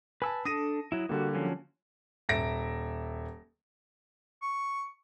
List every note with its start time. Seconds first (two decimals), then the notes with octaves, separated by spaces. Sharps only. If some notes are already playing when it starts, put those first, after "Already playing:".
0.22 B4 G#5 A5 E6
0.45 D4 A4 D#6 A#6 D#7
0.92 F#3 E4
1.09 D3 G3 A#3 F#4
1.35 F3 F#3 C#4
2.29 D#1 E5 A#6 D7
4.42 C#6